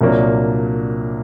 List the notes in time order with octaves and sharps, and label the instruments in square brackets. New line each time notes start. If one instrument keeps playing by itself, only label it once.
[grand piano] C2 A#2 F#3 A#3 D4